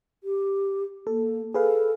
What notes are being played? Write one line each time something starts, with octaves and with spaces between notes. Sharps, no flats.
G4
A#3 A4
G#4 A4 B4 F5